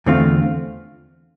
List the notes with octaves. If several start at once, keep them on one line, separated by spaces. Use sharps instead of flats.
E2 D3 A3 C4 F4